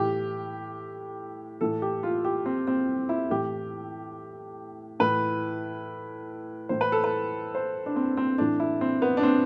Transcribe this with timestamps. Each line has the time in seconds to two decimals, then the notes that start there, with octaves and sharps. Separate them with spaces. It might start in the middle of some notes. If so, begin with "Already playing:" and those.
Already playing: A2 E3 G4
1.61 A2 E3 A4
1.82 G4
2.03 F4
2.25 G4
2.46 C4
2.67 C4
3.09 E4
3.30 A2 E3 G4
5.00 A2 E3 B4
6.69 A2 E3 C5
6.81 B4
6.92 A4
7.04 B4
7.55 C5
7.86 D4
7.96 C4
8.17 C4
8.38 A2 E3 D4
8.60 E4
8.81 C4
9.02 B3
9.17 D4
9.23 C4